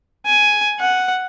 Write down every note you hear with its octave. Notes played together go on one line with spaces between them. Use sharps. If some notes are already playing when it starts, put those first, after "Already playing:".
G#5
F#5